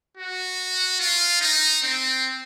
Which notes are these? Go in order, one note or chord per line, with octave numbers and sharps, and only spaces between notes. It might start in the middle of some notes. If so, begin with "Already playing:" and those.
F#4
F4
D#4
C4